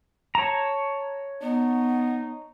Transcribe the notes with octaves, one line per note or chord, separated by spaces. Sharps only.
C#5 A5 A#5
B3 D#4